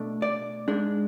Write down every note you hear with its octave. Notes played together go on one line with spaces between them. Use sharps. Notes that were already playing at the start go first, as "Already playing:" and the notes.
Already playing: B2 A3 D4
D5
G#2 G#3 D4